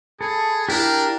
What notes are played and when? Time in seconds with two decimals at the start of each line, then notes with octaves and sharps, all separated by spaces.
0.21 G#4 A4 B5
0.69 D4 E4 G4 A#4 F5